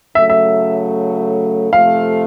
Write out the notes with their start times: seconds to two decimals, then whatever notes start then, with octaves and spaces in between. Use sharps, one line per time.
0.15 C#3 F#3 A3 E5
0.30 E5
1.72 C3 F3 A3 F5